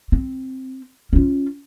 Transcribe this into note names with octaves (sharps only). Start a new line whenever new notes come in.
C4
C#4 F4